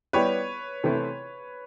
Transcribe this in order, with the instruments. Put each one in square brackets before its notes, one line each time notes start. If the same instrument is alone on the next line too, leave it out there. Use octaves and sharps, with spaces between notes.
[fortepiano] G3 B3 E4 G4 [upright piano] B4 C#5
[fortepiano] C3 E3 A3 C4 E4